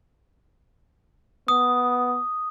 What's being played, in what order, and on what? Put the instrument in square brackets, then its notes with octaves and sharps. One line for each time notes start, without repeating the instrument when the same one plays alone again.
[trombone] B3 [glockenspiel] D#6